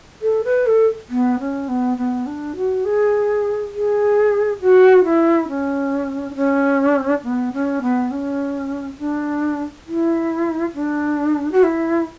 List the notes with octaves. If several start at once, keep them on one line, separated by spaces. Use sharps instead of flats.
A4
B4
A4
B3
C#4
B3
B3
D4
F#4
G#4
G#4
F#4
E4
C#4
D4
C#4
B3
C#4
B3
C#4
D4
E4
D4
F#4
E4